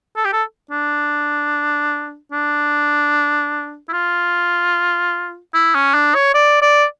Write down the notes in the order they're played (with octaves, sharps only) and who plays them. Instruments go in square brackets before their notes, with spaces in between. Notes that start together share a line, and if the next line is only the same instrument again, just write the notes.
[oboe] A4
G4
A4
D4
D4
E4
F4
E4
C#4
D4
C#5
D5
D5